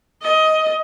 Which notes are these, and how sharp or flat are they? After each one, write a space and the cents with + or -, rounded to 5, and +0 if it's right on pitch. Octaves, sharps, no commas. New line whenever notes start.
D#5 +15